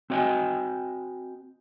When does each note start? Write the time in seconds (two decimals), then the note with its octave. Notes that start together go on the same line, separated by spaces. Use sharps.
0.10 C4 F#4 C#5 D#5 G5 G#5